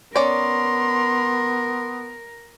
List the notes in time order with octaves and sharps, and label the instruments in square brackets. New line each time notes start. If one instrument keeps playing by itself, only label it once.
[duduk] B3 [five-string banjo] C#4 D5 [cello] A#4 [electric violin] C6